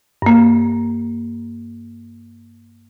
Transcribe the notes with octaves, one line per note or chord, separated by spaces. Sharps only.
G2 A#3